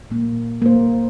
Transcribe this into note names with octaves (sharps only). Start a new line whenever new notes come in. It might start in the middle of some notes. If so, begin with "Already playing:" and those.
A#2 A#3
A#3 C5